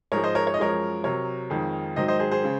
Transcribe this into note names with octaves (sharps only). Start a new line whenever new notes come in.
G#2 F3 G#3 A#4 C#5
C5 D#5
A#4 C#5
C#5
D#5
F#2 F3 G#3 A#4 C#5
C3 F#3 A#4 C#5
F2 D#3 G#3
G#2 D#3 F#3 C5 D#5
C5 D#5
G#4 C5
G#4 C5
C#3 G#3